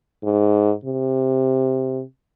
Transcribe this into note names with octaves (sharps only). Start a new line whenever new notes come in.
G#2
C3